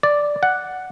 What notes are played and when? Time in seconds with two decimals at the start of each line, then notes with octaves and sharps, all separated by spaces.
0.03 D5
0.43 F#5